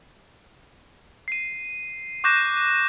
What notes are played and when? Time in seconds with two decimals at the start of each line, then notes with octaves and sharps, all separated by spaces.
1.28 C7 D#7
2.24 C#6 D6 F#6 G6 A#6 E7